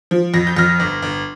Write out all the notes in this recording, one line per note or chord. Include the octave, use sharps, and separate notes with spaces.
F3
F2 A#6
G6
F2 F6 A#6
G1
G1